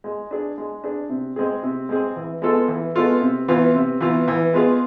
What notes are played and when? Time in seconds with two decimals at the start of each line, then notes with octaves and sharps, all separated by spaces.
0.04 G#3
0.31 D4 G#4
0.58 G#3
0.84 D4 G#4
1.09 C3
1.36 G#3 C4 G#4
1.63 C3
1.89 G#3 C4 G#4
2.16 E3
2.42 G#3 B3 F4 A4
2.68 E3
2.95 G#3 B3 F4 A4
3.22 C3
3.48 E3 B3 F4
3.75 C3
4.01 E3 B3 F4
4.28 E3
4.53 G#3 B3 F4 G#4